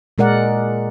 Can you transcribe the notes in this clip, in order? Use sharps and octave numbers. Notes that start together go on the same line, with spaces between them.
A#2 G#3 A#4 D5 F#5